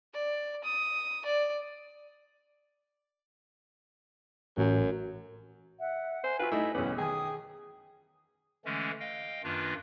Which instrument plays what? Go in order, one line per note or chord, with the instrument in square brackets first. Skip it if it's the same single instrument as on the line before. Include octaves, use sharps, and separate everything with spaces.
[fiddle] D5
D#6
D5
[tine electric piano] A1 [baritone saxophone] F#2
[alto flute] E5 [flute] F#5
[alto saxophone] C5 [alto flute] G#5
[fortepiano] F4 E5 [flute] F#4 [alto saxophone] B4
[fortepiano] A3 D#4 [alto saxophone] E4 [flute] D#5
[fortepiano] B1 E2 [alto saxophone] B3 [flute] C#4
[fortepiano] D#3 G#5 [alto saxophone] G#4 [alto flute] G5 [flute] D#6
[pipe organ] D3 E3 G#3 A3 C#4
D#5 F5 G5
F#2 D#3 A#3 D4 F4 B4